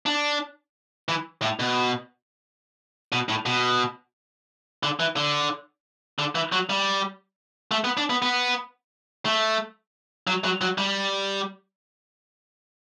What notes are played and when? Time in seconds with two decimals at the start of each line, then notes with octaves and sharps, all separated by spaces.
0.06 D4
1.09 E3
1.42 A2
1.60 B2
3.12 B2
3.29 A2
3.46 B2
4.83 D3
5.00 E3
5.17 D3
6.19 D3
6.35 E3
6.52 F#3
6.70 G3
7.71 A3
7.84 B3
7.97 D4
8.10 B3
8.22 B3
9.26 A3
10.27 F#3
10.44 F#3
10.61 F#3
10.78 G3